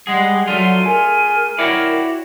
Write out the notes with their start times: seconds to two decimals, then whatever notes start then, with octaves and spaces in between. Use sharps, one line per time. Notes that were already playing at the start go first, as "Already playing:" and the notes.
0.07 G3 G#3 G#4 F#5
0.48 D3 F#3 A3 F4 D#7
0.85 G#4 A#4
1.59 E4 F#4 C#5 D5 G5